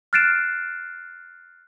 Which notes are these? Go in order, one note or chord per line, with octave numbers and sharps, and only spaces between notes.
F6 F#6 A6 C7 D7 E7